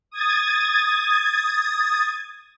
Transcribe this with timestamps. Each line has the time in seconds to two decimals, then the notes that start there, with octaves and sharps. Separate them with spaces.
0.11 D#6 G#6 A6